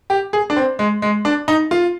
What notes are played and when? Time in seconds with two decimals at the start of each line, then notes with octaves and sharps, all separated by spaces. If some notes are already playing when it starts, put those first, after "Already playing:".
0.10 G4
0.33 G#4
0.50 D4
0.56 C4
0.79 G#3
1.02 G#3
1.25 D4
1.48 D#4
1.71 F4